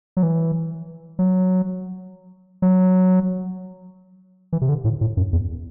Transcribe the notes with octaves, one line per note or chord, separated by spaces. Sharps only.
F#3
E3
F#3
F#3
E3
C3
D3
A2
A2
F#2
E2